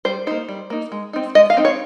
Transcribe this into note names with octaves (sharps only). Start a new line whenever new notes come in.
G3 C5
A#3 D#4 C5
G3
A#3 D#4
G#3
C4 D#4
G#3 D#5
F5
C4 D#4
C#5